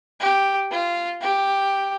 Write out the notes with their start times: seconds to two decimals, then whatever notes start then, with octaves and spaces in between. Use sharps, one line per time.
0.20 G4
0.71 F4
1.22 G4